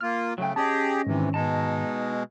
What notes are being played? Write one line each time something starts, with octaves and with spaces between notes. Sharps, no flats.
A#3 F4 F6
C#3 F#3 A3 G5
C#4 G4 G#4 D#5 A5
G#2 C3 D#3 E3
B2 G#3 D#4 A5